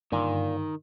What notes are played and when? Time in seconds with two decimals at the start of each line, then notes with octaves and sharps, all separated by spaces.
0.12 G2 A#2 D3 D#3